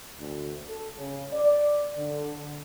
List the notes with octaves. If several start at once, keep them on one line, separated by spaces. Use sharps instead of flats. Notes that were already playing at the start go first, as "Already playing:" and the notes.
D2
A4
C#3
D5
D3